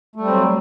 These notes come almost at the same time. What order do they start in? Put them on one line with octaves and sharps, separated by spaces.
A3 G3 C4 F#3